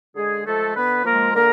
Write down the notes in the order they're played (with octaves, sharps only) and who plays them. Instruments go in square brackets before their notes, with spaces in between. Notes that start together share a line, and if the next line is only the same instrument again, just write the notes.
[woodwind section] D3 G#3 G#4
F3 G#3 A3 A4
D3 B3 B4
F3 G#3 A#3 A#4
D3 A#3 A#4